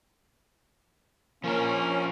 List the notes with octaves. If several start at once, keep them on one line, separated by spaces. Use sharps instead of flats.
F3 A#3 C#4 A#4